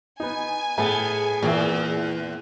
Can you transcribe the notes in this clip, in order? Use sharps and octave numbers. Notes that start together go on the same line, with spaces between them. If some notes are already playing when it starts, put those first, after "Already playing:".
B3 D#4 G#5
A2 B3 G#4
E2 A#2 C4